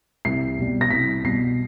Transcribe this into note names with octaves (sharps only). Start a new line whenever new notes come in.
C2 C7
B2 G3
A#6
C2 B6
B2 G3 C7